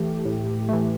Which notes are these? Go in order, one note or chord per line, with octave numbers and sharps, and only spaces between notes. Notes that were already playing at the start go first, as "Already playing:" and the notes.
Already playing: E3 A3 G4
A2
E3 A3